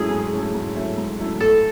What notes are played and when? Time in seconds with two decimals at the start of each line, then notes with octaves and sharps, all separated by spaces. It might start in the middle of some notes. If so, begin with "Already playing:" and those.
Already playing: G#2 F#3 A3 C#4 E4 G#4
0.11 G#2
0.33 F#3 A3 C#4 E4
0.54 G#2
0.75 F#3 A3 C#4 E4
0.97 G#2
1.19 F#3 A3 C#4 E4
1.40 A2 A4